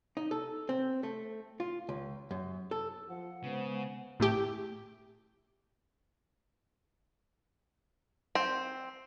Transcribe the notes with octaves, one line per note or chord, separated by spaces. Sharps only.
D#4
A4
C4
A3
F4
C#2
F#2
A4
F3 F#5
C#3 G#3 B3 C5
A2 A3 G4 G5
C4